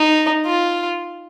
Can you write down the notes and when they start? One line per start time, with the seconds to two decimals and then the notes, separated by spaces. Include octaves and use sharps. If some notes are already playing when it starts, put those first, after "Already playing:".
Already playing: D#4
0.46 F4